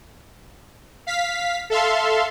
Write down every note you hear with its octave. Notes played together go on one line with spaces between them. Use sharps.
F5 B6
A4 E5 F5 C6